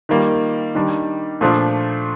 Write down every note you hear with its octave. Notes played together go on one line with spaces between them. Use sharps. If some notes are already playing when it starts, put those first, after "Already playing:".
D#3 G3 A#3 F4
D#3 G3 D4
A#2 F3 A3 D4 F4